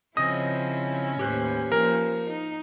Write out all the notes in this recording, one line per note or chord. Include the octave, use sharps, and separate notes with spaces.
C#3 F3 C4 C#4 E4 D#5 D#6
D#2 A2 G4 B4 C5
F3 A#3 A#4
D#4